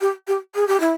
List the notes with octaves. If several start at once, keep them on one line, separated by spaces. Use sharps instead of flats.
G4
G4
G#4
G4
E4